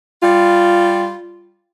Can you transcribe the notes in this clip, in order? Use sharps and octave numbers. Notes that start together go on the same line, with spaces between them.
G3 F4